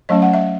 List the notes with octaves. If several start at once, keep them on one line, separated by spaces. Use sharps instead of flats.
F#3 A3 C#4 D#5
F#5
E5